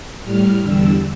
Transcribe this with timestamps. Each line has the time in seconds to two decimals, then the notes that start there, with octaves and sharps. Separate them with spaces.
0.25 A2 G3 F6
0.61 E2 D3 G3 E6